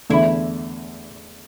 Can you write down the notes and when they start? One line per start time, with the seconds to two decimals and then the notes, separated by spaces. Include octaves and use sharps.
0.10 E2 D3 A3 E4